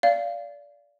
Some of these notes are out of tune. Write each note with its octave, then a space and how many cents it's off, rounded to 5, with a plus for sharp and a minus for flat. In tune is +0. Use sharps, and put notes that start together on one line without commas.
D5 -20 F5 -15